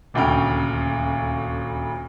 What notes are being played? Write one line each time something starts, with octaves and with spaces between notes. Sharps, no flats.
D#1 D2 C#3 G5 F6